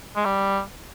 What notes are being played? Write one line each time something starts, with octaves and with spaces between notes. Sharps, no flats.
G#3
G3